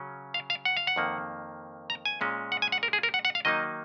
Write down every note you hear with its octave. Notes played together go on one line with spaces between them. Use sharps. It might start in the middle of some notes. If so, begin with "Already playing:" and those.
Already playing: C#3 F#3 C#4
F5
F5
F#5
F5
F#5
F2 D#3 A#3
A#5
G#5
A#2 G#3 C#4
F#5
G#5
F#5
A#4
G#4
A#4
F#5
F#5
F5
D#3 F#3 A#3 D#4 D#5